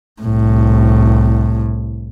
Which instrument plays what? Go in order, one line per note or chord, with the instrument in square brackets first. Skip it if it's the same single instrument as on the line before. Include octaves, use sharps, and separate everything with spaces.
[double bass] C2 A2